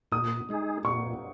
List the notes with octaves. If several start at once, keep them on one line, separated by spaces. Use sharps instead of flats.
A#2 D#6
G#3 D#4 G#4
A#2 C#6